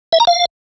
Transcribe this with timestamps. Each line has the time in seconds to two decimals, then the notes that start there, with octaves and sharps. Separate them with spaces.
0.13 E5
0.20 A#5
0.27 F5